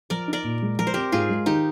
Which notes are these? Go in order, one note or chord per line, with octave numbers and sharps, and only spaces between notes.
F3 A#4 D5
D#4
A#4 D5
A#2
G#3
F3 A#4
C5
C4 G4 A#4
G#2 F4 G#4
G#3
D#3 D#4 G4